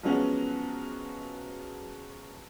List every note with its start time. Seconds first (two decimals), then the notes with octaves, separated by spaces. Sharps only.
0.03 F3 F#3 G#3 B3 C#4 F#4